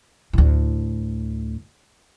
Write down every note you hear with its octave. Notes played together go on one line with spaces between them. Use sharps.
D2 A2